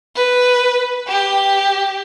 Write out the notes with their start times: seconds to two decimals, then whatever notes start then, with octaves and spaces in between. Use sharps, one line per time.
0.16 B4
1.08 G4